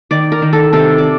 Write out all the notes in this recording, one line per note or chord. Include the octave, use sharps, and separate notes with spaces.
D#3 D5
A#4
D#3
A4
C3 A4
D5